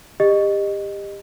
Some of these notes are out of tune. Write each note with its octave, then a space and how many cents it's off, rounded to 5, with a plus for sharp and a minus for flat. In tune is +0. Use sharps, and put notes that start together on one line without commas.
G4 +25 D#5 -20